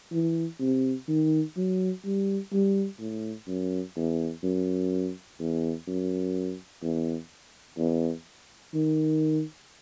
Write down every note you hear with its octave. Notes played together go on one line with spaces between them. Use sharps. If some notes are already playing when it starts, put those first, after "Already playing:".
E3
C3
D#3
F#3
G3
G3
A2
F#2
E2
F#2
E2
F#2
E2
E2
D#3